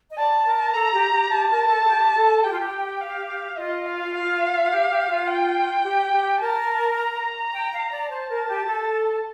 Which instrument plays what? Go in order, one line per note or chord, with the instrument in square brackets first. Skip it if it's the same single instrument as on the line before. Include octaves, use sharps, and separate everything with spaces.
[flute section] D#5
[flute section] D5 [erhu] A5
[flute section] A#4
[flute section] A4 [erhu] A#5
[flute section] G4
G4
[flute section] G4 [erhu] A5
[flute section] A#4
A4
A4
G4
A4
[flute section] G4 [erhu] G5
[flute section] F4
G4
[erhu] F5
[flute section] F4 [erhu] D#5
[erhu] F5
F5
[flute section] F4
G4
G4
F4
[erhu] G5
[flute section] G4
G4
[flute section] A#4 [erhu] A5
[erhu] A#5
[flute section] G5
F5
D5
[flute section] C5 [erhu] A5
[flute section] A#4
G4
A4